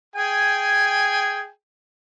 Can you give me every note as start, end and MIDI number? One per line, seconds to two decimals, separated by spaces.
0.16 1.49 68
0.16 1.49 79
0.16 1.49 80